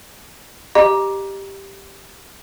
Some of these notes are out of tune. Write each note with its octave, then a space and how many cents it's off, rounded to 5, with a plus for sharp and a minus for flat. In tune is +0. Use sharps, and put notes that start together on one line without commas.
G4 +0 D#5 -30 A#5 +20